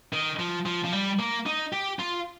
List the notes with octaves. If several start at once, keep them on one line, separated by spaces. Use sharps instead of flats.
D#3
F3
F3
F3
G3
A#3
D#4
G4
F4